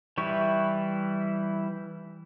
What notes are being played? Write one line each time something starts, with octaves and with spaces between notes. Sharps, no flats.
E3 G3 E4 C#6